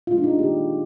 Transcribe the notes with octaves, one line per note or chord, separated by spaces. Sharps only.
A#2 G#3 F4
D4
D#4
D#3 G3 A#3 G4